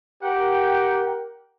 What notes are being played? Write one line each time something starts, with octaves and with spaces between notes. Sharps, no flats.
G4 A#4 F#5 G5